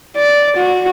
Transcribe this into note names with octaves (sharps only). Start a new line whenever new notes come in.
D5
F#4